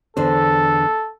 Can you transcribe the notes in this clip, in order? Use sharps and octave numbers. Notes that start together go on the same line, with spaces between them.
E2 D3 A4 C5